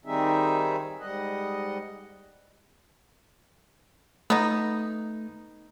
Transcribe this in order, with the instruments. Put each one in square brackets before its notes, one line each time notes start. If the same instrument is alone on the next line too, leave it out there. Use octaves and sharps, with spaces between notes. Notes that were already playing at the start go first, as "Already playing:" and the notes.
[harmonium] D#3 G3 C4 D#4 G#4 E5
G#2 G3 D#5 F#5
[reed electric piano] A3 [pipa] B3 D#4